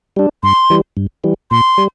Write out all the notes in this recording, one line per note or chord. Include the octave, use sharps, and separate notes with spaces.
G3 D4
G2 C6
E3 G3
G2
E3 G3
A#2 C6
G3